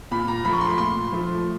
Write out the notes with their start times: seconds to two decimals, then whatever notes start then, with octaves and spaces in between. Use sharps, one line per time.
0.11 A#2 B5
0.28 A#5
0.44 F3 A3 B5
0.53 C#6
0.61 C6
0.70 B5
0.78 A#2 C6
1.12 F3 A3